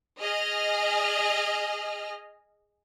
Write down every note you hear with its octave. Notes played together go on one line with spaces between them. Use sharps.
G#4 D#5 F6